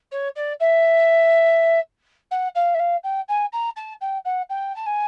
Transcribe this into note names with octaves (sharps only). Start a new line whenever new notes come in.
C#5
D5
E5
F#5
F5
E5
F5
G5
G#5
A#5
A5
G5
F#5
G5
A5
G#5